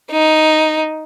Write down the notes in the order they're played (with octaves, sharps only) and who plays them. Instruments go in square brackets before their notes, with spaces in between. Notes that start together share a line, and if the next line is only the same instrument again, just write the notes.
[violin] D#4